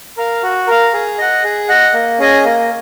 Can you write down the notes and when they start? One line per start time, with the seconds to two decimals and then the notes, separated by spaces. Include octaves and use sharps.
0.17 A#4 F5
0.43 F#4
0.67 A#4 F5
0.93 G#4
1.18 D#5 F#5
1.44 G#4
1.68 D#5 F#5
1.93 A#3
2.19 C#4 G#4 D#5 G#5
2.45 A#3